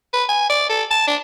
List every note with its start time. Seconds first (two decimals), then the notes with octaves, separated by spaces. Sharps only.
0.13 B4
0.29 G#5
0.50 D5
0.69 A4
0.91 A5
1.07 D4